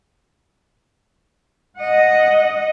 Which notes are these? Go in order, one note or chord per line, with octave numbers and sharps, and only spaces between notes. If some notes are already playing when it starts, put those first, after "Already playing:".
D#5 F#5